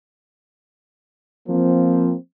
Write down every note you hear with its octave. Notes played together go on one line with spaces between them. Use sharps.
F3 A#3 C4